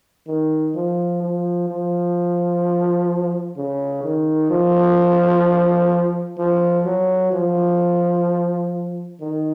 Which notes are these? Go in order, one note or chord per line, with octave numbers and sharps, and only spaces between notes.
D#3
F3
F3
F3
C#3
D#3
F3
F3
F#3
F3
D#3